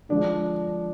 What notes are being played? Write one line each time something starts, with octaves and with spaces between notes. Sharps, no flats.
D3 F3 G#3 D4